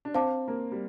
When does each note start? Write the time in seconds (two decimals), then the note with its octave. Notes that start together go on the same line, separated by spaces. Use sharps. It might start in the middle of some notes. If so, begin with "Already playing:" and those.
0.05 D4
0.14 C4 C5 F5 A5 D6
0.48 A#3
0.72 G3